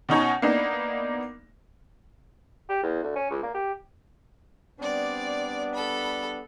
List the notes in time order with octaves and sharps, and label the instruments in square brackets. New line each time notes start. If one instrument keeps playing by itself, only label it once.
[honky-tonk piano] B2 C#4 D#4 C#5
A#3 B3 D4 D#4
[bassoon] G4
E2
D2
C#4
C#2
A#3
G4
[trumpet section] G3 B3 D4 [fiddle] C4 D5
[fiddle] A4 B5